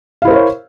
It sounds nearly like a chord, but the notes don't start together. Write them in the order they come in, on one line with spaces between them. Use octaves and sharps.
F5 E4 C5 A#4 C#5